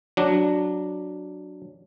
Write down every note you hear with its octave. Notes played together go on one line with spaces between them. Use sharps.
F#3 D4